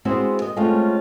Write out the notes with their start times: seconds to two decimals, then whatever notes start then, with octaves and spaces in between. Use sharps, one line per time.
0.05 G#3 B3 C4 E4 F#4 G#4
0.42 D#5
0.56 G#3 A3 C4 C#4 F4